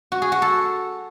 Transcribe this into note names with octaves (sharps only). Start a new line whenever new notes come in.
F#4
G#4
F#4
A4